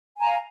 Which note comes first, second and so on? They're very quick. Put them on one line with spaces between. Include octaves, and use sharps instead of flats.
G#5 A#5 F5